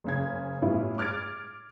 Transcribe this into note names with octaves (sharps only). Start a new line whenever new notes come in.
F#1 C#3 G#6
A2 G3 B3 C#4 E4 F4
D6 F6 G#6 A6 D7